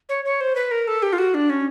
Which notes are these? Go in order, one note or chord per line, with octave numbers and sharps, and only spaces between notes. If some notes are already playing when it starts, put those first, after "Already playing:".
C#5
C#5
C5
B4
A#4
A4
G4
F4
F#4
D4
C#4